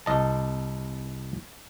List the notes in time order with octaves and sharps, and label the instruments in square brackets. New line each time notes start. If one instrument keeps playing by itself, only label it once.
[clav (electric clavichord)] C2 D#5 A5